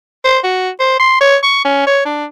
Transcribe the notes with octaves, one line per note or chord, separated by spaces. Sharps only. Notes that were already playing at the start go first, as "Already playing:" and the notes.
C5
F#4
C5
C6
C#5
C#6
C#4
C#5
D4